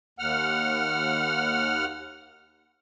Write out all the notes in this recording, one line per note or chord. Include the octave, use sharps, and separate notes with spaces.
D#2 F#5 F6